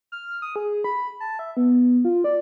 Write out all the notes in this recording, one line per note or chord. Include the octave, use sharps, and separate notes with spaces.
F6
D#6
G#4
B5
A5
E5
B3
F4
D5